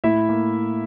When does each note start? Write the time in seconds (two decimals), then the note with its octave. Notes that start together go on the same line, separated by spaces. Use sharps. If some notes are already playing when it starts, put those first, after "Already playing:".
0.04 A2 E4 E5
0.29 A#3